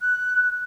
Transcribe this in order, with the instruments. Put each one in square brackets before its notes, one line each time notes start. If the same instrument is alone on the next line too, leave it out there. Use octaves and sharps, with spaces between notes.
[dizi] F#6